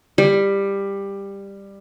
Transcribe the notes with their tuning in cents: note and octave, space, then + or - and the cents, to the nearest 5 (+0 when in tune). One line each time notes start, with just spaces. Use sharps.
G3 +15